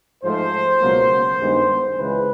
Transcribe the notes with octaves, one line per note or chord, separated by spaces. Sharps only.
G#2 F3 A3 C5
C#2 B2 F#3 A#3
G2 D#3 G#3 B3
C#2 C#3 E3 G#3 B4